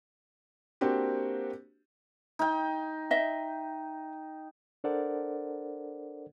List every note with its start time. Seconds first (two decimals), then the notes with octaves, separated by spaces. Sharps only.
0.81 A#3 C4 D4 F#4 G4
2.39 D#4 G5
3.11 D#5 E5
4.84 D4 A4 A#4 C5 D5 F#5